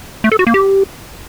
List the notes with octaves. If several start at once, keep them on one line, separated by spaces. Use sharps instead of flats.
A3
A4
F#4
A#3
G4